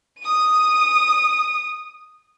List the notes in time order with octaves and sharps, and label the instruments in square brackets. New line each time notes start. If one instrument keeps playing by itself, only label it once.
[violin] D#6 D#7